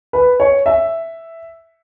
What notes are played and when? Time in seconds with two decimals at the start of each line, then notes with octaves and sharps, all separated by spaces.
0.13 B4
0.40 C#5
0.66 E5